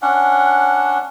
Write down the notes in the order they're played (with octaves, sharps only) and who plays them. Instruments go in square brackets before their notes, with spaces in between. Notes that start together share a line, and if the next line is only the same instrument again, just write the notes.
[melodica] C#4 D4 F#5